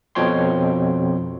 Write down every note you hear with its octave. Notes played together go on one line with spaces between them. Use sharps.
F2 B2 F3 C#5 G5 C6